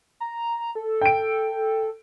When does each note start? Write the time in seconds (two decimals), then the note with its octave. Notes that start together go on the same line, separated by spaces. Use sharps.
0.20 A#5
0.75 A4
1.01 G5 D7